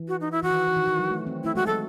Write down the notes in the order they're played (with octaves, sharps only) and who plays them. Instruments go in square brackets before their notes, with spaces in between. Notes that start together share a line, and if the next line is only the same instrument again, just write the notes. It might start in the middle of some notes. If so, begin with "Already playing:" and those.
Already playing: [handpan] E3
[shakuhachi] F#4
D#4
E4
[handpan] E3 [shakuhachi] F#4
[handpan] D#3
E3
D#3
E3
F#3
A3
C4
[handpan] A3 [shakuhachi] E4
[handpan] G#3 [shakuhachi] F#4
[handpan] F#3 [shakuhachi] A4